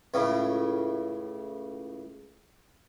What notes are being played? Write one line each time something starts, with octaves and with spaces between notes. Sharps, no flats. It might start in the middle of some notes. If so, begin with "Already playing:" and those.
C#2 A2 C#3